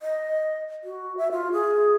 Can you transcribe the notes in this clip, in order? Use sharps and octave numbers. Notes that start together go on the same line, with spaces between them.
D#5
F#4
E5
F4
G#4